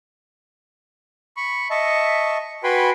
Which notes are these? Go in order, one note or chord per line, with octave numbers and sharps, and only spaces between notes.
B5 C#6
D#5 E5 A5 C#6
F#4 B4 G5 G#5 B5 C6